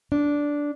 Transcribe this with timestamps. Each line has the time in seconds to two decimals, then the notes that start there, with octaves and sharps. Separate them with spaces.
0.12 D4